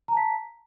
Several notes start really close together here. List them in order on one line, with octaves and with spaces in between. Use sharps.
A#5 A5 B6